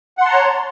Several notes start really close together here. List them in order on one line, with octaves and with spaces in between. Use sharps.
F#5 C6 A5 A#5 C#5